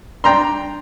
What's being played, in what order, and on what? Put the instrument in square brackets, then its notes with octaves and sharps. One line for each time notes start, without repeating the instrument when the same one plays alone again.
[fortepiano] D4 G5 A#5 C6